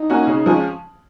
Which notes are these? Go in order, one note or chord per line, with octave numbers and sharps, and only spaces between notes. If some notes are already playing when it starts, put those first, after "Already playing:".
Already playing: D#4
A#3 C#4 F#4
C#3
F3 G#3 C#4